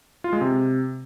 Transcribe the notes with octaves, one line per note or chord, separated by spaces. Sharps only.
F4
G#3
C3